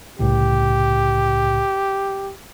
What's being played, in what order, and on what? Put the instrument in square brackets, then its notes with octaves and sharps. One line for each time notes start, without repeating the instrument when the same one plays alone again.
[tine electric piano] C2 A2 C#3 [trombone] G4